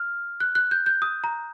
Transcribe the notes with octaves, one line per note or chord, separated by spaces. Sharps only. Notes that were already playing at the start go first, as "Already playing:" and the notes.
Already playing: F6
F#6
F#6
G6
G6
D#6
A#5